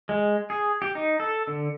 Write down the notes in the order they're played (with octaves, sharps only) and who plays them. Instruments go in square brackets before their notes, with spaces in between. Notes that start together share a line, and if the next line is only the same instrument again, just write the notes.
[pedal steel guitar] G#3
G#4
G4
D#4
A4
D3